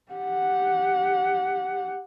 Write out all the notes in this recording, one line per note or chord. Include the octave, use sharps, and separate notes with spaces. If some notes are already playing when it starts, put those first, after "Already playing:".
G4 F#5